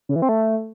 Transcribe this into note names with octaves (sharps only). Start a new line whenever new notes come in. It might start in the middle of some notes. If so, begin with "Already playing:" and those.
C#3
E3
C4
A3